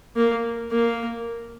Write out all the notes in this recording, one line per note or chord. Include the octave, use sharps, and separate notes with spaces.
A#3
A#3